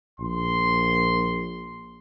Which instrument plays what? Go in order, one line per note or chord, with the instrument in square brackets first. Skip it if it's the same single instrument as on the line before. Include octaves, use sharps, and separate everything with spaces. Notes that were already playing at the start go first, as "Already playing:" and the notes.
[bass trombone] A#1 [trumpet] C6